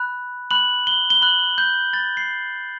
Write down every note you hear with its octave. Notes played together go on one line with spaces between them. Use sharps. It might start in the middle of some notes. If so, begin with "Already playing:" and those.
Already playing: B5 F#6
B5 F#6 F#7
G7
G7
B5 F#6 F#7
G6
B5 F#6 A6
C7